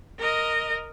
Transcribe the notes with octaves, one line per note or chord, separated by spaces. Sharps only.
A#4 D#5